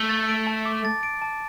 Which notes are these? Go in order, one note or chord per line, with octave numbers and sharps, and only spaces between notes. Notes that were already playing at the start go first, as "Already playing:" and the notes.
Already playing: A3
A6
D7
A5
D6
A6
D7
A5